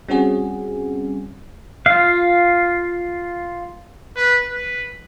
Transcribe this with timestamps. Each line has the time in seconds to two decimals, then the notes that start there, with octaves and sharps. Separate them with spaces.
0.08 G3 C4 C#4 F#4 G#4
1.86 F4 F5
4.16 B4
4.50 B4